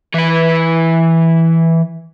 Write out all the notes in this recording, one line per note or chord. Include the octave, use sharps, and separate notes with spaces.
E3 B4